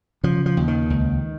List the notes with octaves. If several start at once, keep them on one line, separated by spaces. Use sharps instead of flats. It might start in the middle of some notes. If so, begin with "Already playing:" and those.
C#3 F3
F3
D#2
D#3
C#2